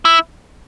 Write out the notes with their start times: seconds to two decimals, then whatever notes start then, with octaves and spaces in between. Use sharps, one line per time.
0.05 E4